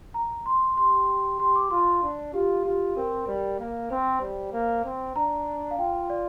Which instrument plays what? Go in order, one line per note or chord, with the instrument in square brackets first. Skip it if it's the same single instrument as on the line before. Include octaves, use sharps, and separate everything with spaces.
[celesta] A#5
C6
[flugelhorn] G4 [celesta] C6
[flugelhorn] G4 [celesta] C6
[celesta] D6
[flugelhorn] F4 [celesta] C6
[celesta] C6
[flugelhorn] D4
[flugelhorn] F4 [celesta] G4
[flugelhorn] F4 [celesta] G4
[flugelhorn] C4 [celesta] A#4
[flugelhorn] G3
A#3
[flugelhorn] C4 [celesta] C5
[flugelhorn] G3
A#3
C4
[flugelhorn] D4 [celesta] A#5
[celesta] F5
[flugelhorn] F4 [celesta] G5
[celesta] D5